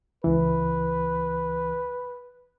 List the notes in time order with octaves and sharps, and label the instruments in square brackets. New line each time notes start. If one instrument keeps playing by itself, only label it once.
[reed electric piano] C#2 E3 [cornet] B4